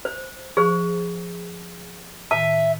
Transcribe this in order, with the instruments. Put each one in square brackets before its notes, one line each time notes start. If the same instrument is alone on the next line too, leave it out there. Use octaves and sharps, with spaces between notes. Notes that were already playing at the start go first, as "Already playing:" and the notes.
[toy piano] C5
[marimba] F3 C#6 [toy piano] G#4 C5
[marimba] A2 D#3 [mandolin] E5 [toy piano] A5